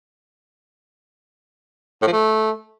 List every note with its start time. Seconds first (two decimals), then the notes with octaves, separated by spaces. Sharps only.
2.02 A2
2.07 F3
2.12 A3